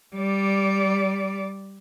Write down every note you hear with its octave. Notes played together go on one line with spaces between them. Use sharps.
G3 D5